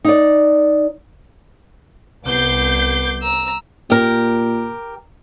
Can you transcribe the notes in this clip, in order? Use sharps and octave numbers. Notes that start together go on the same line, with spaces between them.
D#4 D5
C2 B3 D6 G6 C7
A#5 E6
A#2 G4 A#4